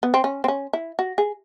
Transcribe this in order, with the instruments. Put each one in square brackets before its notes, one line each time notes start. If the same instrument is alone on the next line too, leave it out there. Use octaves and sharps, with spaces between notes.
[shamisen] B3
C4
C#4
C4
C#4
E4
F#4
G#4